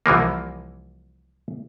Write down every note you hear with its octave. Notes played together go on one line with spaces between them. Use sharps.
C2 E3 F3 A#3